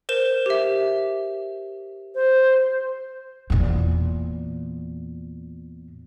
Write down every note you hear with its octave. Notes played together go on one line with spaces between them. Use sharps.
A#4 C5 E7
G4 E5
C5
E2 A#2